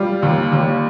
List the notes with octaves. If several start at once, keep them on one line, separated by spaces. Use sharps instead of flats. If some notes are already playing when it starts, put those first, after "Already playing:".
Already playing: G3 F4
D#2
D#2